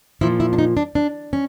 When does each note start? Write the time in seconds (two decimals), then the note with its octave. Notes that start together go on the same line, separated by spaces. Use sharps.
0.21 A#2 F3 E4
0.40 E4
0.53 D4
0.58 D#4
0.77 D4
0.95 D4
1.33 C#4